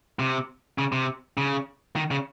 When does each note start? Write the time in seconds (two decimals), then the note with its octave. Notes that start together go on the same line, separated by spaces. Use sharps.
0.19 C3
0.78 C#3
0.92 C3
1.38 C#3
1.96 D#3
2.11 C#3